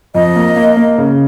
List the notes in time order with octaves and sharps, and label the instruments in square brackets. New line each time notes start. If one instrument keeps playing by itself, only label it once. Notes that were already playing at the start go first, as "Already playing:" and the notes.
[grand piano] F2 [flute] D#5
[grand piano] A#3
A#3
A#3
C#3